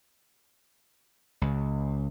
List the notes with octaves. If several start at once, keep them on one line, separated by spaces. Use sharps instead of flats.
C#2